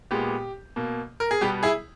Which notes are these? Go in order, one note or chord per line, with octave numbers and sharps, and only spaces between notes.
A#2 G#3 B3 G4
B2 A#3
A#4
G#4
B2 G3 B3 G4
E4 G#4